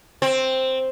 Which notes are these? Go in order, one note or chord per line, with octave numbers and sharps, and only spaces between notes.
C4